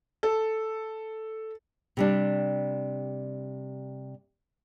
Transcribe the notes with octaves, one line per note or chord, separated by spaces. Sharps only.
A4
C3 G3 D4